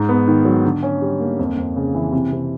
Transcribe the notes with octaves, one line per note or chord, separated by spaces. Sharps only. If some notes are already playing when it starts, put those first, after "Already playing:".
Already playing: G#2 D#4
B3
D#3
F#3
D3
C#4
G3
A#3
F2
F2
C#3
E3
C3
C3